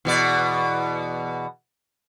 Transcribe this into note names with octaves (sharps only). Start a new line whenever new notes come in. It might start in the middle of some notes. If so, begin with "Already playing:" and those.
E2 B2 D5